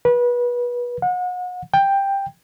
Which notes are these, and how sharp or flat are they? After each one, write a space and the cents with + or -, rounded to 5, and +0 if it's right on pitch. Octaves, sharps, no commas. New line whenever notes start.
B4 -25
F#5 -35
G5 +10